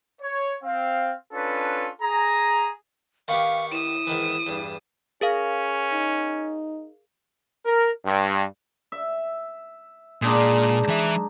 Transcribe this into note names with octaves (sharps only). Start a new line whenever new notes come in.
C#5
C4 F5
C#4 D4 F4 A4 B4
G#4 A#5
D#3 B3 G4 F5 C#6
E4 D#6 E7
G#2 D#3 E3
E2 G2
C#4 G#4 A#4 F5
D#4
A#4
G2
E5
A#2 G#3 D4 D#4
E3 E5